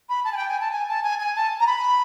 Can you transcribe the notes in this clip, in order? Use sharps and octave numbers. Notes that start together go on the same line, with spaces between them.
B5
A5
G#5
G5
G#5
A5
G#5
A5
G#5
G#5
A5
A#5
B5